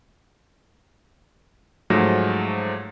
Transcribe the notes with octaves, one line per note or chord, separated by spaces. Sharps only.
G#2 F3 F#3 A3 A#6